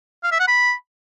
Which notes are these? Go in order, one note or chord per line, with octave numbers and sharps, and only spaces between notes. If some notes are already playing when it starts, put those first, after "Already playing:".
F5
E5
F#5
B5